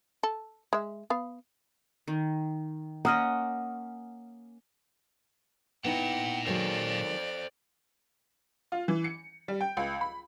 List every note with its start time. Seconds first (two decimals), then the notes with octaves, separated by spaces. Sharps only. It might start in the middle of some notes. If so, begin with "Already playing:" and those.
0.23 A4
0.73 G#3 E5
1.10 B3 F5
2.08 D#3
3.05 A#3 C#4 D#5 F#5 A#5 D#6 F6
5.85 A#2 B3 D#4 E4 F#5 G5
6.47 D#3 F#3 G#3 A4 C5 D5 G5
8.72 F4
8.88 E3
9.04 C#7
9.48 G3
9.61 G5
9.77 C#2
10.01 B5